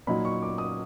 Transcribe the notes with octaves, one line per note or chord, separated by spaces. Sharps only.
A#2 F#3 A#3 D#4 B5
C#6
D6
D#6